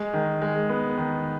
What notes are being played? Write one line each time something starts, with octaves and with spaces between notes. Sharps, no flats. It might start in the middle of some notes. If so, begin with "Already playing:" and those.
Already playing: G#3
D#3
G#3
B3
D#3